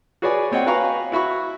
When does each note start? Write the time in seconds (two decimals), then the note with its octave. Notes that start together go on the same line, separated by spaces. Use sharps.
0.22 F#4 G#4 B4 C#5 D5 G#5
0.52 C4 C#5 D#5 F#5 G5
0.66 F#4 B4 F5 G#5 A#5 C#6
1.12 E4 F#4 B5 C#6